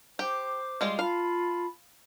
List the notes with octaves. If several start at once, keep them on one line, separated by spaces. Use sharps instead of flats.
G4 C5 D6
G3 G#3 F4
F4 F5 A5 B5